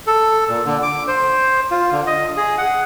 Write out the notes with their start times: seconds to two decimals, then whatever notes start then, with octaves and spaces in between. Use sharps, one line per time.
0.07 A4
0.49 A#2
0.66 D3
0.83 D6
1.08 C5
1.71 F4
1.92 D3
2.07 D#5
2.37 G#4
2.58 F#5